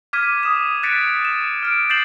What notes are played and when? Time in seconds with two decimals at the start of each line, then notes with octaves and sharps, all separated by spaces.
0.13 D6 F6 G#6 B6 D#7
0.43 D#6 E7
0.83 F#6 A6 B6 C#7 D7
1.25 E7
1.63 F6 D7
1.90 G6 A6 C7 E7 F#7